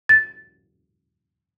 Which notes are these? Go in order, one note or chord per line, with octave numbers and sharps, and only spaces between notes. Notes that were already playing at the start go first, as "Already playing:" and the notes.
A6